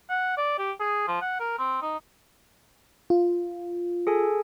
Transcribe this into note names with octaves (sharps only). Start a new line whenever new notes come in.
F#5
D5
G4
G#4
F3
F#5
A#4
C4
D#4
F4
G#4 A4 G#5